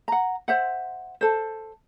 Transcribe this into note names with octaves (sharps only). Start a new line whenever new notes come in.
F#5 A#5
C5 E5 F#5
A4 C5